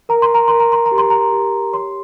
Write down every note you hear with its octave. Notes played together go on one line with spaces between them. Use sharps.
A#4 A#5
C6
A#5
A#4 C6
A#5
C6
A#5
G4
C6
A#5
G4
C#5 C6